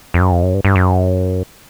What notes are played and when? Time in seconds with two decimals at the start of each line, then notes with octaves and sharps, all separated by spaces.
0.14 F2
0.21 F#2
0.32 F2
0.43 F#2
0.54 G2
0.65 G2
0.76 F#2